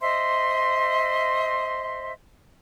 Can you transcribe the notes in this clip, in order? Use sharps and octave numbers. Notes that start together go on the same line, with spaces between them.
C5 D#5 E5 C6